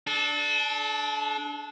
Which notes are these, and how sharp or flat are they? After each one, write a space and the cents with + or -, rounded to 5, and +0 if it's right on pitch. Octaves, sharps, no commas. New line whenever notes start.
D4 +0 A4 -40